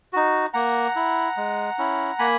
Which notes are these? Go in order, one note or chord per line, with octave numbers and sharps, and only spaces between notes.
D#4 F#4
A#3 F#5 A#5
E4
G#3
C#4 E4
A#3 G#5 B5